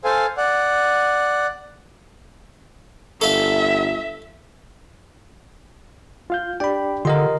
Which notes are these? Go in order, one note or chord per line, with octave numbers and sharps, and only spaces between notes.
A4 C5 F5 G#5
D5 F#5
G1 A4 E5 F5
F4 F5 G6
D4 G4 D5 G5 B5
D3 F4 G4 A#4 D#5 C6